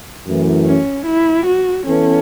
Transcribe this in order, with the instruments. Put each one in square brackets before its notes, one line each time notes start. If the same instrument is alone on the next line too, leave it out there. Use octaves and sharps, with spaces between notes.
[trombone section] F#2 E3 A3
[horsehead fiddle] C#4
E4
F#4
[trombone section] E3 B3 A4 [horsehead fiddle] C#4